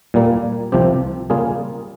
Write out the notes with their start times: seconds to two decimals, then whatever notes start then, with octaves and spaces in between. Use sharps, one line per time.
0.14 A#2 G3 A#3
0.72 C2 C3 F3 C4 G4
1.30 C#3 G3 A#3 F4 G#4